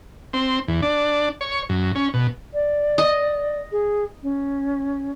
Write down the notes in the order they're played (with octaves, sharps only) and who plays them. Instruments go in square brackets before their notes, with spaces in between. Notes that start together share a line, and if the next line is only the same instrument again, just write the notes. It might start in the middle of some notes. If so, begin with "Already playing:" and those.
[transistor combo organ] C4
E2
D4
C#5
F#2
C#4
B2
[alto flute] D5
[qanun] D#5
[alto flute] G#4
C#4